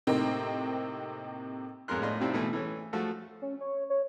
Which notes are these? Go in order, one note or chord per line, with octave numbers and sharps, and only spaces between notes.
A2 C3 A#3 C4 D#4
A1 F2 G#3 A#4 C6 F#6
A2 D4 F4 D#5 C6
C3 D#3 C4 D4 E4 F4
B2 E3 A3 E4
E3 A3 C#4
F3 A3 F#4
C#4
C#5
C#5